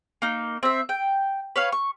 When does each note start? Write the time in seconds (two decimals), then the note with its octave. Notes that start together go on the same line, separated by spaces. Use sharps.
0.22 A#3 D#4
0.63 C4 E5
0.89 G5
1.56 B4 C#5 F5
1.72 C#6